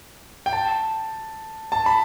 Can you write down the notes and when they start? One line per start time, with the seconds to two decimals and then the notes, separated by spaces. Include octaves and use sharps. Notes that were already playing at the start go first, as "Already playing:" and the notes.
0.46 G5
0.53 A5
1.72 A5
1.86 B5